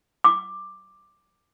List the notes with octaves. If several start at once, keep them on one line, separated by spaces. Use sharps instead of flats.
D6